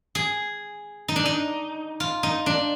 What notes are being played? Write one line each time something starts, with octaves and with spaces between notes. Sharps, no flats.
G#4
D#4
D4
D#4
F4
D#4
D4